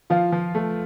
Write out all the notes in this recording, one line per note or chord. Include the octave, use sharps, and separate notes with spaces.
F3 F4 F5
F3
A3